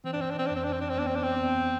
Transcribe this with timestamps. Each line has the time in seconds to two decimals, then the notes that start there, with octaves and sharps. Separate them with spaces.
0.04 E3 C4
0.13 D4
0.21 C4
0.30 D4
0.39 C4
0.47 D4
0.51 F2 C4
0.64 D4
0.72 C4
0.81 D4
0.89 C4
0.98 B3 D4
1.07 C4
1.15 D4
1.23 C4
1.44 B3